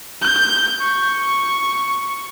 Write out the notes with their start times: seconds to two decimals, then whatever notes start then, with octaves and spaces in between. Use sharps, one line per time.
0.22 G6
0.80 C#6